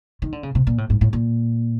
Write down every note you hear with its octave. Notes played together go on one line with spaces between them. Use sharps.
D#3
D3
C#3
C3
A#2
A2
G#2
A2
A#2